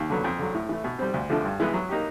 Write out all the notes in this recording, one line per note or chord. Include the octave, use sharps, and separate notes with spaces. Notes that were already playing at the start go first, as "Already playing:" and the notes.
Already playing: D#2
D3 F#3 B3
F2
D3 F#3
A2
E3 A3
B2
G3 C4
D2
D3 F3 A3 D4
G2
E3 G#3 B3
F#3
A#3 D#4 G4